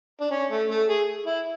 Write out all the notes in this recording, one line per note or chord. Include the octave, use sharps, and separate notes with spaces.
D4
C#4
A3
A3
G#4
E4